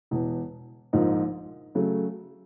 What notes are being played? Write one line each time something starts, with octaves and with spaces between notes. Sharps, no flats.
E1 E2 B2
A#1 G#2 F3 A#3 D#4
C#3 F#3 A3